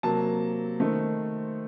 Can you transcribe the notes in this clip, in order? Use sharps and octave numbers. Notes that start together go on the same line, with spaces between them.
C3 F#3 A#3 A5
D#3 A3 C4